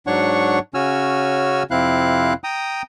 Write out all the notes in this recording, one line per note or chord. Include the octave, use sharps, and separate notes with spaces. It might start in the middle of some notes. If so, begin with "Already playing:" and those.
G#2 F#3 D4 C#5 F#5 C#6
C#3 C#4 F#4 G#5 E6 F6
F2 C3 C4 E4 F5 F#6
G5 A#5 D#6